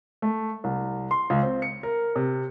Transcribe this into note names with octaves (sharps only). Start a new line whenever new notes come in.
A3
C2
C6
C#2
C4
C#7
A#4
C3